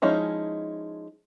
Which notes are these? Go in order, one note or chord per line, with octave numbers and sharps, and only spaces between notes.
F3 G#3 C#4 D#4 E4